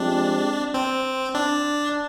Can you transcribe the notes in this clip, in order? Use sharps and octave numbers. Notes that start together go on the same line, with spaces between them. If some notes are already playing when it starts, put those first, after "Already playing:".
Already playing: F3 G#3 C4 D4 G4
C4
D4